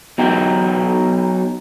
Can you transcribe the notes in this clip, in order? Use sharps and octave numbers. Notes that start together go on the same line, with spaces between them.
F#3 B3 D#4 G5